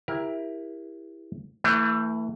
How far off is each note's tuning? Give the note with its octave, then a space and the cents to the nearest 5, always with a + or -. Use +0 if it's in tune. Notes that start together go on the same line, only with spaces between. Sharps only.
E4 +0 G4 +25 A#4 +20
E3 +0 A3 +35